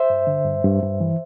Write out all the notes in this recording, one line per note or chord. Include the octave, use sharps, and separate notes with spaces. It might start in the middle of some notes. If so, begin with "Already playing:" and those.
Already playing: C5 E5
G2
D3
G2
G2
G2
E3